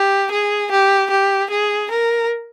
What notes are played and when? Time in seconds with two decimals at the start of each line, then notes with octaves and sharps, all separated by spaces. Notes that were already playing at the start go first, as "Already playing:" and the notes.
Already playing: G4
0.31 G#4
0.71 G4
1.10 G4
1.50 G#4
1.90 A#4